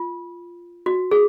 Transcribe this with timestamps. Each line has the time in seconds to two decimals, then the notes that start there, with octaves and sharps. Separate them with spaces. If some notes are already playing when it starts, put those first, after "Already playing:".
Already playing: F4
0.86 F#4
1.11 G#4